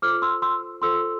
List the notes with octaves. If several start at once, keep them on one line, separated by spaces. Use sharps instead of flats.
F4 A4 C5 D6 F6
C6 E6
C6 E6
F4 A4 C5 C6 E6